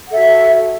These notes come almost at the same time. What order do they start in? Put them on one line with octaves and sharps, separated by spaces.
F#5 A4 E5 F#4